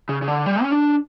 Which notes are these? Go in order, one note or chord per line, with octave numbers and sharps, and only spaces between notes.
C#3
C#3
D3
G3
C#4
D4